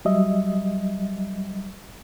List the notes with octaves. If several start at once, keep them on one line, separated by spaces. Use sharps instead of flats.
F#3 G3 D#5 E5